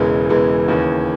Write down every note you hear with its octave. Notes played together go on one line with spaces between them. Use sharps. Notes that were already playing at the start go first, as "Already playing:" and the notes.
Already playing: E1 E2 C#3 E3 G#3
E1 E2 C#3 E3 G#3
D#2 C#3 E3